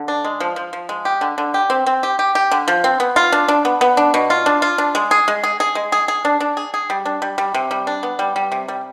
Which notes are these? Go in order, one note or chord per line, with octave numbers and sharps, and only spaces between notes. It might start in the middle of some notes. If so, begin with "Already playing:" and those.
Already playing: D3
D4
G#3
F3
F3
F3
G#3
G4
D3
D3
G4
C4
C4
G4
G4
G4
D3
F3
C4
B3
F4
D4
D4
B3
B3
D4
B2
F4
D4
F4
D4
G#3
G#4
G#3
G#4
G#4
G#3
G#4
G#4
D4
D4
G#4
G#4
G3
D4
G3
G3
C3
G3
D4
B3
G3
G3
C3
G3